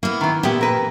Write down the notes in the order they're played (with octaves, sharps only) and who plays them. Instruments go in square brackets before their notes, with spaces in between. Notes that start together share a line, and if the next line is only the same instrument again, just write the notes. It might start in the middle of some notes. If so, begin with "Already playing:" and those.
[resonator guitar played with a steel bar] A#3 [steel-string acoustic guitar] B3 E4
[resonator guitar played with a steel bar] D#3 E3
[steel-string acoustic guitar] A#2 E3 E5 [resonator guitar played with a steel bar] B3 G4
[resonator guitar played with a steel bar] A#4 B4